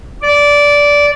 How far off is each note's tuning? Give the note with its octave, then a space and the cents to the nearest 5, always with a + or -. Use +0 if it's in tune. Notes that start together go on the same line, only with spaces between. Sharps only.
D5 -15